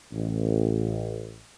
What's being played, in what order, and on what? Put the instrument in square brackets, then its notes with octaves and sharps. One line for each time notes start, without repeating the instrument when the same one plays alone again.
[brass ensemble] A1